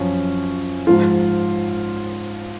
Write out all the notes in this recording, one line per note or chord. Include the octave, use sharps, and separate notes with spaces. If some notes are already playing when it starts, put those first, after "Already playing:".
Already playing: F#2 F3 C#4
G#2 F3 F4